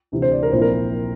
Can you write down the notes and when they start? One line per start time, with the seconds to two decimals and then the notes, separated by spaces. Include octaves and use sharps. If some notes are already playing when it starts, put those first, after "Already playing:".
0.12 D2 C3 E3
0.22 C5
0.32 D5
0.43 A#4
0.52 A#1 A#2 F3 C4 E4 C5
0.62 A#4